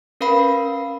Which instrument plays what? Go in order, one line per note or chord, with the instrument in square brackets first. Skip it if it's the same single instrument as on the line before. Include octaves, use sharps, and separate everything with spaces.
[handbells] C#4 A#4 B4 F5 B5 C7